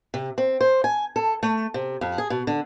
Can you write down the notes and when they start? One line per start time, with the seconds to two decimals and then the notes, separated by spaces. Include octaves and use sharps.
0.14 C3
0.38 C4
0.61 C5
0.84 G#5
1.16 A4
1.43 A3
1.74 C3
2.01 F2
2.18 G#4
2.30 B2
2.47 D3